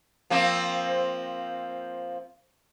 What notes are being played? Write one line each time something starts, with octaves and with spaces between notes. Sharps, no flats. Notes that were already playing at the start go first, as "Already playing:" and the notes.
F3 A#3 C4